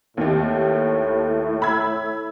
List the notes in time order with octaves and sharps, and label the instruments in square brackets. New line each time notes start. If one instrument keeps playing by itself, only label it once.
[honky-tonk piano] D#2 D#3 G4 [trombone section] A2
[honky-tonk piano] B5 E6 G#6